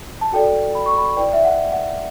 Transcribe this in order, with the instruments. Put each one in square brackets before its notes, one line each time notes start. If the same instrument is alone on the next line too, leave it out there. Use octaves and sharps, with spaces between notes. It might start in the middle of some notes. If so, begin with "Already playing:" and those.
[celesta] A5
F#4 A4 D5 G5
B5
C#6
B5
E4 B4 D5 G5
E5
F#5
F#5